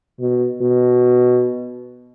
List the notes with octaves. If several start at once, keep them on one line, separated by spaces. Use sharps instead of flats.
B2
B2